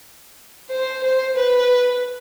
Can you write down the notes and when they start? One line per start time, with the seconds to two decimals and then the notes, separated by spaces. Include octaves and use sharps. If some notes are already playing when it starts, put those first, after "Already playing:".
0.69 C5
1.03 C5
1.36 B4